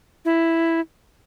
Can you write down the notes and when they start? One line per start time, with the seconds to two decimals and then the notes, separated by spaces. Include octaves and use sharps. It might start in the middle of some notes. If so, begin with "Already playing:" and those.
0.25 E4